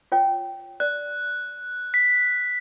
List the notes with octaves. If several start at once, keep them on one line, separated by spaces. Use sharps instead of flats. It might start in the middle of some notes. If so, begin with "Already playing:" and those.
F4 C#5 G5
D5 F#6
B6